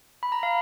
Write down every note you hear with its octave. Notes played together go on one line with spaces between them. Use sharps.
B5
A#5
F5